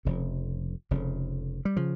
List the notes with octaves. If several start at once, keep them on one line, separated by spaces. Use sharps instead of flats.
F1 F2 C#3
F1 F2 C#3
G3
C#3 F3